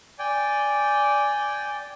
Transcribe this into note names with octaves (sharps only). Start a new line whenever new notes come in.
D5 G5 G#5